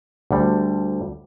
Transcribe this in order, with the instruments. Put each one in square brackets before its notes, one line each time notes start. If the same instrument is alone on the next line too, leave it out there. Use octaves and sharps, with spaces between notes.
[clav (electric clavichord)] D2 D3 G3